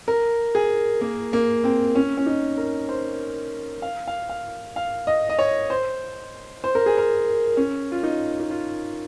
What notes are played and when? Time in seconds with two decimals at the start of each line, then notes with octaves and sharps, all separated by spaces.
0.08 A#4
0.55 G#4
1.01 A#3
1.33 A#3
1.64 C4
1.95 C#4
2.17 C#4
2.26 D#4
2.57 A#4
2.89 C5
3.82 F5
4.07 F5
4.29 F5
4.76 F5
5.07 D#5
5.29 D#5
5.39 C#5
5.70 C5
6.64 C5
6.75 A#4
6.86 G#4
6.98 A#4
7.57 C#4
7.92 F4
8.03 D#4
8.40 D#4
8.50 F4